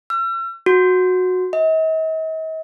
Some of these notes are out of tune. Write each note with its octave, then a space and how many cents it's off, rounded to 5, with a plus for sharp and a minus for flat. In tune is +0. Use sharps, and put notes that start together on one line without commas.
E6 +45
F#4 -10
D#5 +45